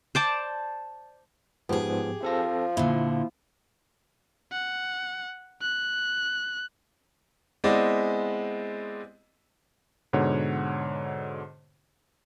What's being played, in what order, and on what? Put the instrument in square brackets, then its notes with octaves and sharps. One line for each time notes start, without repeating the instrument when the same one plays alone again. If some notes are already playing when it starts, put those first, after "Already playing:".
[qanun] C5 D5 A5
[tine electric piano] G#2 F3 B3 [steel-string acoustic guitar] G4 G#4
[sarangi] F3 [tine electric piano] C4 A4 A#6
[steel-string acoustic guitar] A#2 D3 [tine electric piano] E4
[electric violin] F#5
F#6
[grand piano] G#3 B3 C4 E4 D5 D#5
[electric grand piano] G#2 B2 D3 C#5 F#5